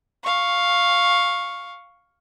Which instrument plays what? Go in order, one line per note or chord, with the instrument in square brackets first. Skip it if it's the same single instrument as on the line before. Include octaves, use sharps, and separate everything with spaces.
[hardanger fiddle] F5 C#6